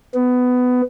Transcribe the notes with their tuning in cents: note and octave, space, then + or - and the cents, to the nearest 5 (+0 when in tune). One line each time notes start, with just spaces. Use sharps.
B3 +15